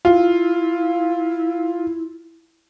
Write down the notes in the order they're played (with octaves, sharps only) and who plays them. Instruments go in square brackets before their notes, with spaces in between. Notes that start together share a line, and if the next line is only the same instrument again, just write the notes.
[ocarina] E4 [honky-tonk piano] F4